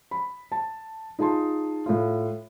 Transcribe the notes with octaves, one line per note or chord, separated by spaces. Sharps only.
B5
A5
D#4 F4 G#4 A5 C6
A2 F4